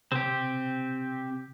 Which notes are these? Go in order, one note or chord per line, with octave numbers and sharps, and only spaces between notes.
C3 C4 G4